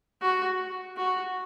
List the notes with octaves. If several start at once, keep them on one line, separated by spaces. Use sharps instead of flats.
F#4
F#4